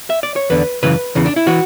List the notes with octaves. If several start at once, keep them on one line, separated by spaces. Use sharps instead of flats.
E5
D5
C#5
E2 D3 B4
F#2 C#3 E3 B4
E2 C#3 E3
D4
E4
E3 F#4